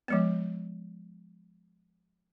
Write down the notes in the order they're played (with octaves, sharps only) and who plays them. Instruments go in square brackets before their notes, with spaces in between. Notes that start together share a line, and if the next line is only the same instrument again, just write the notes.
[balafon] F3 G#3 B3